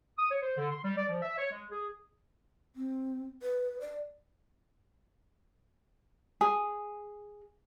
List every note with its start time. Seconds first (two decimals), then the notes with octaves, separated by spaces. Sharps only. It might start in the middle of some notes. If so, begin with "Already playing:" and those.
0.18 D#6
0.30 C#5
0.42 C5
0.57 D3
0.70 C6
0.84 G3
0.96 D5
1.08 F3
1.22 E5
1.37 C#5
1.51 G#3
1.71 G#4
2.76 C4
3.42 B4
3.81 D5
6.41 G#4